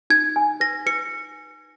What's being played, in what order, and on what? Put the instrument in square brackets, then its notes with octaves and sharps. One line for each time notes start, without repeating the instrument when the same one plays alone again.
[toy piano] D#4 [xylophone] G#6
[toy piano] G#5
[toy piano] B4 [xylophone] A#6
[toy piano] B4 [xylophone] C#7